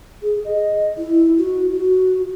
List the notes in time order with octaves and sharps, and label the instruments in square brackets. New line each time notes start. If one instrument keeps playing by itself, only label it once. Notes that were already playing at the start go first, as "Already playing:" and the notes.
[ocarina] G#4
D#5
E4
F#4
F#4